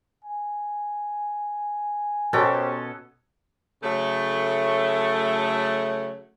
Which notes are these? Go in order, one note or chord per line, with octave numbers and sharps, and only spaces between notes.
G#5
B2 B3 C#4 G4 A4 A#4 C5 G5
C#3 F#3 A3